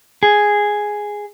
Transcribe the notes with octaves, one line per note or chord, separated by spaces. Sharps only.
G#4